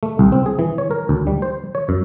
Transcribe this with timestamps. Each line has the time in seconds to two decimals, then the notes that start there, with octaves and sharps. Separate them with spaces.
0.03 A3
0.19 C2
0.32 C4
0.46 G#4
0.59 E3
0.78 C#5
0.91 A#4
1.09 D2
1.27 G3
1.42 C5
1.75 C#5
1.89 F#2